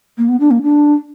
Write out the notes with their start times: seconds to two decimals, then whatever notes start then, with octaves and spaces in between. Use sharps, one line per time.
0.18 A#3
0.29 B3
0.40 D4
0.51 A#3
0.62 D4